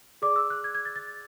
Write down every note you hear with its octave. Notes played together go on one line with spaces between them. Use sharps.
G#4 D5 D6
E6
F#6
G#6
G#6
A6
A6